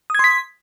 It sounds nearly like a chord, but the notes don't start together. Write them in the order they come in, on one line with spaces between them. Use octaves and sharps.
D#6 G#6 C6 B6